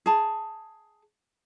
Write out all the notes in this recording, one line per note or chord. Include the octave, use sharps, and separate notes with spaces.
G#4 A5